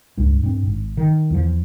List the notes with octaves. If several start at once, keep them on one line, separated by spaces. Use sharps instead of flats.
C#2 G2
G2 C4
G#1
D#3
E2 F3